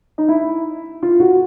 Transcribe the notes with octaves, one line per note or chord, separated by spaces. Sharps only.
D#4
E4
F4
F#4